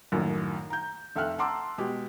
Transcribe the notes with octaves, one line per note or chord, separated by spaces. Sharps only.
A#1 F#2 A2 D#3
A#5 G6
F1 A4 E5 G5 F6 F#6
F#5 A5 A#5 C6 D6 E6
B2 G#3 G4